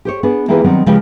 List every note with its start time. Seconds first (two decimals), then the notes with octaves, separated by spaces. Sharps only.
0.05 G4 C5 C#5
0.23 B3 D4 G#4 B4
0.48 E3 A#3 F4 G4 G#4 B4
0.64 D#3 F#3 G3 B3 C4 D4
0.86 C#3 F3 G#3 A#3 G4 B4